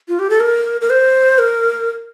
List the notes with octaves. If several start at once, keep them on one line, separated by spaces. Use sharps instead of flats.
F4
G4
A4
A#4
A#4
C5
A#4